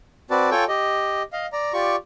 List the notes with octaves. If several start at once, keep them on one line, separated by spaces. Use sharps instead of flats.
C4 F#4 B4 D5 A5
F4 A4 C#5 G5 G#5
G4 D#5
D#5 F5
D5 A#5
F4 G4 D5 C#6